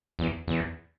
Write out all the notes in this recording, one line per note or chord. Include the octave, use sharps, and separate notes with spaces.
E2
E2